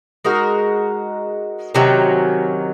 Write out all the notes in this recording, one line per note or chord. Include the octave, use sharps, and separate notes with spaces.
G#3 D#4 F#4 A#4
C3 D#3 F#3 C#4